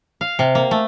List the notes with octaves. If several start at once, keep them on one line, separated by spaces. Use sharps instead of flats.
F5
C3
A#3
A3